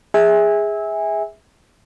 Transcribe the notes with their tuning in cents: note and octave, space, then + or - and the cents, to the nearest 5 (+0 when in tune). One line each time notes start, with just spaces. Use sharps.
G#4 -10 E5 -20 G#5 -20